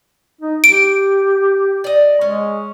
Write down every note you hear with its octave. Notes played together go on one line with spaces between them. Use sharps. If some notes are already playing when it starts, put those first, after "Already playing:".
D#4
G4 D7
D5 D#5
G#3 C#4